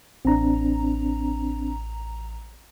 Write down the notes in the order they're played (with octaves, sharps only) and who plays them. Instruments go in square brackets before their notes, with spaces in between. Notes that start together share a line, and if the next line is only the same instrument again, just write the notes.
[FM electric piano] A1 A#5 [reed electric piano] C4 D4